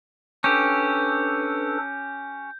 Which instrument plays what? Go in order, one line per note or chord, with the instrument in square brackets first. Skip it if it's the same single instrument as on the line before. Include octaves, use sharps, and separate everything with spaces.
[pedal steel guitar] C#4 G4 [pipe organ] D4 A4 B4 [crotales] G6